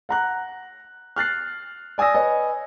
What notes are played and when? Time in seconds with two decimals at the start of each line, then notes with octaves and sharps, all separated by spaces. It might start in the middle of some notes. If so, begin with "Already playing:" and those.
0.09 F#5 A#5 F#6
1.16 F6 F#6 A6 C7
1.98 D5 G#5 D#6 E6 A#6
2.15 B4 C#5 D#5 G#5